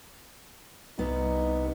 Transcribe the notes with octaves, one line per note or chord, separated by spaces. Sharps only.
C2 B3 D#4